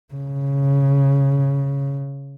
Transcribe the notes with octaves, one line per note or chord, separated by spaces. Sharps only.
C#3